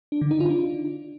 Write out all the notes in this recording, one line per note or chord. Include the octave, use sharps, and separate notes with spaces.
D4
D3
D#4
F4
D4